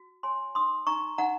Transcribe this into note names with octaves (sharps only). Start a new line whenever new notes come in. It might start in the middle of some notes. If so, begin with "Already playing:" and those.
Already playing: F#4
C#5 G#5 C6
D#4 C6 D#6
D#4 A#5 C#6
D#4 F#5 A#5